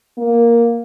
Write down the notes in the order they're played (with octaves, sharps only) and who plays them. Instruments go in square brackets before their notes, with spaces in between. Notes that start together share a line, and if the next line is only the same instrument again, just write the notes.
[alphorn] A#3